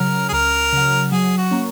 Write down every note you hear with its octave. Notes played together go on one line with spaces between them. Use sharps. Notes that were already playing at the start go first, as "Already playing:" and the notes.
Already playing: C#3 F#3 A#4
G#4
C#2 A#4
C#3 F#3
F#3 G#4
F#4
A#3 C#4